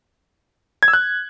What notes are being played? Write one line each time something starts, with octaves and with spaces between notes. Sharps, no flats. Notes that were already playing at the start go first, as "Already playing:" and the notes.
G#6
E6
F#6